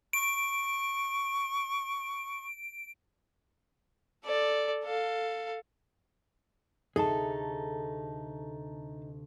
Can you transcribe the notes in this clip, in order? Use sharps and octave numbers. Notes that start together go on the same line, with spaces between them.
C#6 D7
A4 D5
A4 F5
D2 C3 D#4 G#4 A4 A5